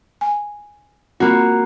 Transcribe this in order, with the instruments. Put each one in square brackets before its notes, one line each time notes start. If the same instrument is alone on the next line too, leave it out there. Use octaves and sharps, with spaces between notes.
[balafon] G#5
[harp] A#3 F#4 [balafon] C4 F4 B5